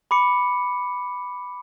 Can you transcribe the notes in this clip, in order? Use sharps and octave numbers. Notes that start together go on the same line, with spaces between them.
B5 D6 C#7